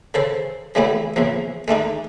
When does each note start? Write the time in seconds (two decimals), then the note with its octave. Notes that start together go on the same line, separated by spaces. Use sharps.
0.14 C#3 A4 C5
0.75 C#3 E3 G3 A3 B3 E4
1.16 A#1 E2 C#3 F3
1.68 G#3 A3 D4 D#4